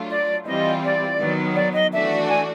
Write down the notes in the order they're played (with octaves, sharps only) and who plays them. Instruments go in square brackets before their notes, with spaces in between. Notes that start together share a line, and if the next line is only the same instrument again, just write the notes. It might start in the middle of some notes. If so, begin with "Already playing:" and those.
Already playing: [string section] F#3 A3 D4 F4
[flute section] D5
[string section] E3 G3 C4 F4 [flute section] D#5
[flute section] D5
[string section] D#3 F#3 B3
[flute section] D5
D#5
[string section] E3 A3 D4 F#4 [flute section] E5
[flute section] G#5